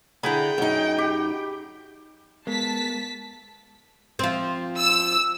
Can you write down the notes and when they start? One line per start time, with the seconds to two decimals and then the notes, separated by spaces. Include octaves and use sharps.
0.23 D3 E4 G#4 G5 A#5 B5
0.58 F#2 D#4
0.98 G4
2.47 G#3 B3 A#4 A5 B6
4.19 F3 C4
4.78 E6